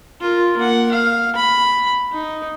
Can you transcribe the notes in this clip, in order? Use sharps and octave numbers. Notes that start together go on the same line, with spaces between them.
F4 A#4
A#3 F#5
F5
B5
D#4